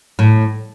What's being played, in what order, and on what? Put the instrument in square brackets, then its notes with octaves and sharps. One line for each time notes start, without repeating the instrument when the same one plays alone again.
[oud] A2